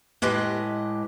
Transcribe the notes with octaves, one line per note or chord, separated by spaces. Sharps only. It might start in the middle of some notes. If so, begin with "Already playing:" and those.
A2 G#3 G4 B4 D#5